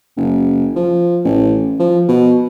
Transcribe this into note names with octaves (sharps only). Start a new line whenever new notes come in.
F#1
F3
A1
F3
B2